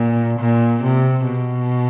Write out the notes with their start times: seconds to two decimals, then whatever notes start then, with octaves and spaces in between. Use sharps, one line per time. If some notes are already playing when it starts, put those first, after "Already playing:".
Already playing: A#2
0.39 A#2
0.83 C3
1.25 B2